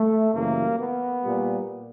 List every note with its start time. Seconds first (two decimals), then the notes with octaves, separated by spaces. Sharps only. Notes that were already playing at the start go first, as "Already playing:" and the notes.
Already playing: A3
0.33 F#2 C#3 E3 G3 A#3
0.78 B3
1.24 A#2 G3